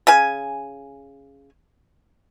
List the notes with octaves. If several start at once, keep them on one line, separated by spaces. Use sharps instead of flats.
C#3 G#5